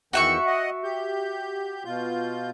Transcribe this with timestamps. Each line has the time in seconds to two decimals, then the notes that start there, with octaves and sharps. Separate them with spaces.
0.13 E2 D#3 F#4 E5 G5 C#6
0.47 D#5 F#5
0.84 G4 G6
1.85 B2 F4 G6